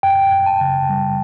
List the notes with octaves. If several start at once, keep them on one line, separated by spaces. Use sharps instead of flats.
F#2 G5
F#2
A5
C#3
G3